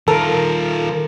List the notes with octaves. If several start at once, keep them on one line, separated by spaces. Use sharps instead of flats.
D#3 F4 A4 A#4